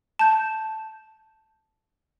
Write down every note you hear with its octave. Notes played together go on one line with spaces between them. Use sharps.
A5 G6